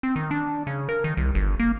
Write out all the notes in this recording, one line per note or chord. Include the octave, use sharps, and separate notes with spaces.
C4
D#3
D4
C#3
A#4
D#3
C2
G1
A#3